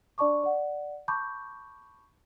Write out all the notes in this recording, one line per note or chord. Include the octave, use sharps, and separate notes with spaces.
D4 D5 A5 C#6 D6
D5 F#5
A5 B5 C#6 D6 G6